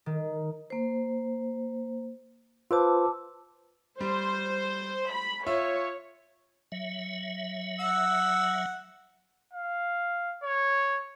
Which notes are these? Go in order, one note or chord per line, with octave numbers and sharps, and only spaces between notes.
D#3
A#3 C5
F4 B4 C5 A5 D6 E6
G3 C5
B5
F4 C#5 E5
F#3 E5
F#5 E6
F5
C#5